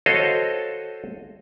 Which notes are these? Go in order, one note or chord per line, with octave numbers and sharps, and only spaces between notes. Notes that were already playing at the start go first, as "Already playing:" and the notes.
F#4 A4 C5 C#5 D#5 F5